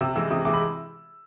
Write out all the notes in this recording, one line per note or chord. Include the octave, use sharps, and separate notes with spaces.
C3 E6
E3 G#3 E6
C3 D#6
E3 G#3 D6
B5